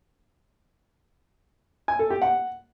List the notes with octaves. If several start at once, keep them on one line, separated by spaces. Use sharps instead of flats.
G#5
A4
G4
F#5